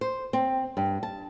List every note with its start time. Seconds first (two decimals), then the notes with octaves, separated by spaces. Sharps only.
0.01 C5
0.33 C4
0.77 G2
1.03 A5